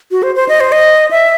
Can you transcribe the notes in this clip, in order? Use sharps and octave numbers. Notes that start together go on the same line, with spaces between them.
F#4
C5
C5
D#5
C5
D#5
E5